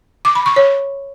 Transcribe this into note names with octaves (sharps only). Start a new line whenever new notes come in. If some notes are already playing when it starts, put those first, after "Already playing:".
D6
B5
C#6
C#5